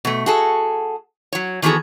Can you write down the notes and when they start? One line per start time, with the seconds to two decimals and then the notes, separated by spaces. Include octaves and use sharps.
0.05 B2 A3
0.26 F#4 G#4 A4
1.32 F#3 C#5
1.62 D#3 E3 B3 F#4 G#4 A4